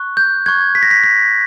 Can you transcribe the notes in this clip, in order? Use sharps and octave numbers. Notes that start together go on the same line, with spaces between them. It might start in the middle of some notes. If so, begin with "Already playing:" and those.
Already playing: C#6 F#6
G6
C#6 F#6 G#6
B6
A#6
B6
B6